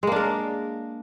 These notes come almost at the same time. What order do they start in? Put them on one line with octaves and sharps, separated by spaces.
G#3 A#3 D4 A#4